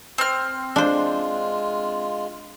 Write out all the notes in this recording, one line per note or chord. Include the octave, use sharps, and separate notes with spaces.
C4 F6
G#3 D4 F4 C5